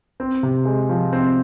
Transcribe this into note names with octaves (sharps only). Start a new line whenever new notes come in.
C4
C3
G#3
F3
C4